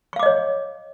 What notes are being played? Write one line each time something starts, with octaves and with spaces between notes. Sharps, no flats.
C#5 D#5 F5 C#6 D6